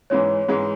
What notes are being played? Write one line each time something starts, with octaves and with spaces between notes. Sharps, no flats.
G#2 E3 G#3 C#5
G#2 E3 G#3 G#4